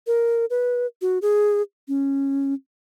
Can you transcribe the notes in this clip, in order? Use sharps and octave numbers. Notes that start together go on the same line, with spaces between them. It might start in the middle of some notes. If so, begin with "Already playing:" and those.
A#4
B4
F#4
G#4
C#4